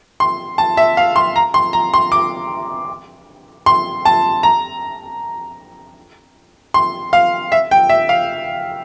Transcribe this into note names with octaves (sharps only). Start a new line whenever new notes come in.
C6
A5
E5
F5
C6
A#5
C6
A#5
C6
D6
C6
A5
A#5
C6
F5
E5
G5
E5
F5